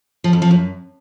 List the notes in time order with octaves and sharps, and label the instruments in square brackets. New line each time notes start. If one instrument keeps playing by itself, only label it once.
[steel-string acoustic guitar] F3
F2
F3
F#2